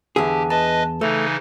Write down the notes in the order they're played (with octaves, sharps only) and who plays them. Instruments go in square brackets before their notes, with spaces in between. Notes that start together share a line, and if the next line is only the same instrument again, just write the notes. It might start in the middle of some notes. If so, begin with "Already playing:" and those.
[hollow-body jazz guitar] E2 G#4 [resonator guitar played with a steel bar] D3 [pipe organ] G4
[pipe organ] B4 D#5 [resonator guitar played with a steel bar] A5
[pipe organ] C#3 E3 D#4 [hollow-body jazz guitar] A3